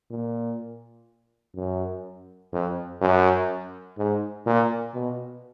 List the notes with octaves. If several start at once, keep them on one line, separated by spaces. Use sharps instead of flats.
A#2
F#2
F2
F#2
G#2
A#2
B2